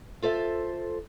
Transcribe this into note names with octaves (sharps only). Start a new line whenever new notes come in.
F4 A4 C5 E5